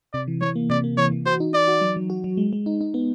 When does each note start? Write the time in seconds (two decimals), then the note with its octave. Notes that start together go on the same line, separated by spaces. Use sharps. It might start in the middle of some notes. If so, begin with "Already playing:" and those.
0.14 C3 D5
0.28 E3
0.41 E3 C#5
0.56 A#3
0.70 C3 D5
0.84 A#3
0.97 E3 C#5
1.12 E3
1.26 F#4 C5
1.40 D#4
1.54 D#4 D5
1.68 F#4
1.81 F#3
1.96 F#3
2.10 F#4
2.24 F#3
2.37 G#3
2.53 G#3
2.66 D#4
2.81 D#4
2.94 B3